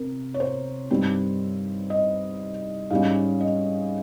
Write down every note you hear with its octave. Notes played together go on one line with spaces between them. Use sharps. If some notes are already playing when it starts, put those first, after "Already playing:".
Already playing: C3 A#4
C#5
C5
G2 G3 C4 D#4
D#5
G#2 G3 C#4 F5
D#5